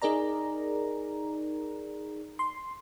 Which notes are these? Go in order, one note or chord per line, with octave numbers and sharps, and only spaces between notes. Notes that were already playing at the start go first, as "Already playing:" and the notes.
D#4 G#4 A#4 D5 A#5
C6